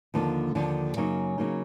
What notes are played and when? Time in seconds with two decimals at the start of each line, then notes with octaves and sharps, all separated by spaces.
0.14 D#2 D3 F3 A#3
0.55 D#2 D3 F3 A#3
0.96 F#2 C#3 F#3 A#3 D#4
1.38 C#3 F#3 A#3 D#4